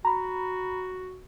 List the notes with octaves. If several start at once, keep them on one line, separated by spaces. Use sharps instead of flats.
F#4 A#5 B5